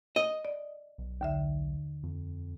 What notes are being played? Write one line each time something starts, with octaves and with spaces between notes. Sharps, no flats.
D#5
D5
B1
D#2 D3 E5
F2